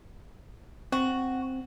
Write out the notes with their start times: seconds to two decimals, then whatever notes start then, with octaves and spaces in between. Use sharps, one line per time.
0.92 C4 F#4